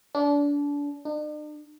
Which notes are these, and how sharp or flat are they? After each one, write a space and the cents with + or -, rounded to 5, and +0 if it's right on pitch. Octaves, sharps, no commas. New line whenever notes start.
D4 -30
D4 +45